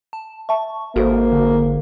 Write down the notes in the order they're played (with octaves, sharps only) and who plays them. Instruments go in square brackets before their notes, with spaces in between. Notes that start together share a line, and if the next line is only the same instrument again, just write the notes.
[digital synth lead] A5
[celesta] E5 A5 [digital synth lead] C#6
[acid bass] G#1 [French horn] A#3 [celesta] F#4 A4 C5 [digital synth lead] A#4
[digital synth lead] D3